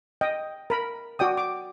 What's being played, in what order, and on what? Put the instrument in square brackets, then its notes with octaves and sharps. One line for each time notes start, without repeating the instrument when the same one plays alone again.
[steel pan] D#5 G5
A#4 B5
F#4 D5 G5 D#6
D6